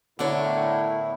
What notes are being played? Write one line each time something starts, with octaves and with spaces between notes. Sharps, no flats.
A2 D3 B3 D4 E4 A#4 C#5